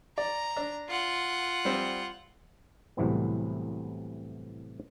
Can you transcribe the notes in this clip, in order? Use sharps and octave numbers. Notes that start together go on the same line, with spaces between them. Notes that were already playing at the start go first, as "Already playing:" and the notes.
D5 A#5
D4
F4 F#5
G3 C4
C2 A2 C3 E3 F#3 B3